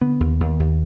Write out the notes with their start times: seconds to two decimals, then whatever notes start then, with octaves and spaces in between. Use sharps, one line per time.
0.01 D3 B3
0.20 D#2
0.40 D#2
0.60 D#2